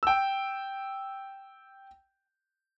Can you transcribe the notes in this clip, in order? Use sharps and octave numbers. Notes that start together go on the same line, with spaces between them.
G5 E6